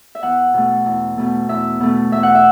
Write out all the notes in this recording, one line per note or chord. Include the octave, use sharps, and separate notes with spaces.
E5
E2 F#5
B2 A3
E2
B2 A3
E2 E5
B2 A3
E2 E5
F#5
E5